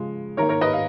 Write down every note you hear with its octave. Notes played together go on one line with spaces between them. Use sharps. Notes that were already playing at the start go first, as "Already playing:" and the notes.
Already playing: C#3 F3 G#3
D#3 A#3 A#4 C#5
A#4 C#5
B4 D#5
F5